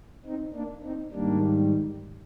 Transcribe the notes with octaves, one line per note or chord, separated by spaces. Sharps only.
C4 D#4
A#3 D4
C4 D#4
G#2 D#3 G3 A#3 D4